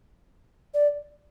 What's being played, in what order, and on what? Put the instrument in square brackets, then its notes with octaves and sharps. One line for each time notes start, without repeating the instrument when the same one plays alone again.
[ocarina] D5